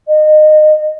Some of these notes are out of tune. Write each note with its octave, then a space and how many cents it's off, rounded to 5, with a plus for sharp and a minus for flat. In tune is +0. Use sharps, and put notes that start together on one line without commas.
D#5 -25